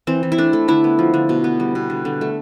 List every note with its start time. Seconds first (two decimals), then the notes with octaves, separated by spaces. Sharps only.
0.07 E3 C4
0.23 E3
0.32 E4
0.38 A3 D4
0.53 A3
0.68 D3 E4
0.84 B3
0.99 F3
1.14 D3
1.29 B2
1.44 B3
1.60 G3
1.75 B2
1.90 D3
2.05 D3
2.21 A3